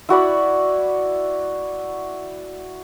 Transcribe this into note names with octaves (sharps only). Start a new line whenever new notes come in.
E4 F#4 D5 B5